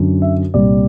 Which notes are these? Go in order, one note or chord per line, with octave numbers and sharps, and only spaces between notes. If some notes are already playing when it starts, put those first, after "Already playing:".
Already playing: F#2 D3 F#3
E5
C2 A#2 G3 D5